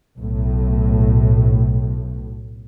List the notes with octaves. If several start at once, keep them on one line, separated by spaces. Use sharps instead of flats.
B1 A2